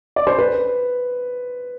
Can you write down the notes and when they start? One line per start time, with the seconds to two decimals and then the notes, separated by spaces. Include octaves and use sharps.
0.16 D5
0.27 C5
0.38 B4